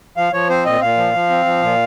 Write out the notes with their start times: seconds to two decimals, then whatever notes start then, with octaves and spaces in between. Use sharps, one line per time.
0.17 F3 F5
0.33 F3 C#5
0.49 C4 C5
0.66 A#2 D#5
0.81 A#2 F5
0.97 F3
1.14 F3
1.30 C4
1.46 F3
1.62 A#2